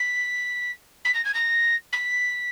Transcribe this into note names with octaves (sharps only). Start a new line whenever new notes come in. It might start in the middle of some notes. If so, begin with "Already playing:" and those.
Already playing: B6
B6
A#6
G#6
A#6
B6